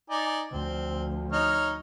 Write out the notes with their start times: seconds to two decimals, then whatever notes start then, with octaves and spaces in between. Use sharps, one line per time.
0.10 D#4 D5 G#5
0.52 D2 F3 C4
1.32 D#4 C#5 F6